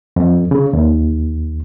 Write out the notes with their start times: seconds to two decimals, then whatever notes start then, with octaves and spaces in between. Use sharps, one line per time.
0.16 F2
0.51 C#3
0.73 D#2